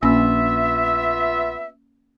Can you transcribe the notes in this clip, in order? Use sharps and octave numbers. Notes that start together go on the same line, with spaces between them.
A#1 A#3 B3 C#4 F4 E5 E6